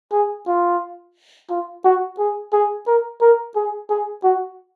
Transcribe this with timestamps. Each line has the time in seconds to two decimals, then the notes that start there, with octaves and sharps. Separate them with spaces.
0.12 G#4
0.47 F4
1.50 F4
1.85 F#4
2.19 G#4
2.53 G#4
2.88 A#4
3.21 A#4
3.56 G#4
3.90 G#4
4.24 F#4